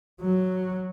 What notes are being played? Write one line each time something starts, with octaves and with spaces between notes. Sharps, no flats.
F#3